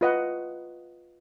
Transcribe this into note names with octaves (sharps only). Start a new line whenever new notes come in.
F4 B4 D#5 F#5